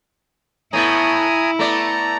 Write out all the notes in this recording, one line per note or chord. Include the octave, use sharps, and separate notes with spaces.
A2 B3 E4 G#5 A#5 D#6
A3 B3 D5 A#5